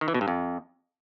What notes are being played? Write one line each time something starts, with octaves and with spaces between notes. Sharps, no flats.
D#3
E3
B2
G2
F2